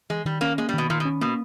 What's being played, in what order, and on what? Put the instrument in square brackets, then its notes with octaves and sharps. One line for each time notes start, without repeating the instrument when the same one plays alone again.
[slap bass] E3 [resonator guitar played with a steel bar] G#3
[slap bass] D#3 [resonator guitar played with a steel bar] G3
[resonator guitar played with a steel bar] A#3 [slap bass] C#4
[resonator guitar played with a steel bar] G#3 [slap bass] A#3
[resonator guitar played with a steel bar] G3
[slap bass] D#3
[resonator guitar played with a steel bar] B2
[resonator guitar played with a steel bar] A#2 [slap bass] D#3
[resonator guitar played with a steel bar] B2
[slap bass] C#4
[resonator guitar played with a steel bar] B2 [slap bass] A#3